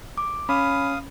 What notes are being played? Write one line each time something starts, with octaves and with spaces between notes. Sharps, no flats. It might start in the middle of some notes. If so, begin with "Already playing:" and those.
D6
C#4 F5 B5 D#6